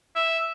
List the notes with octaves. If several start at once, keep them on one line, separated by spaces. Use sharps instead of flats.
E5